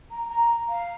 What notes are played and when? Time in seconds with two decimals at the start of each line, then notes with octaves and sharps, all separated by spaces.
0.11 A#5
0.30 A#5
0.69 F5